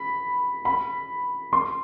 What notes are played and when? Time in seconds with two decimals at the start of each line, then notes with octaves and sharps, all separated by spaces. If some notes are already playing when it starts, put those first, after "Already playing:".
Already playing: B5
0.65 B5
1.53 C6